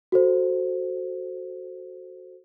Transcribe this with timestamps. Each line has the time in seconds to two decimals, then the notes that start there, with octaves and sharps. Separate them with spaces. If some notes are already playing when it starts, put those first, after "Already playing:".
0.12 F#4 A4 C5